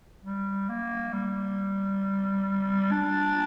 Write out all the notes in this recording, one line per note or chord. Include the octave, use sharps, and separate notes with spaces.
G3
A#3
G3
D4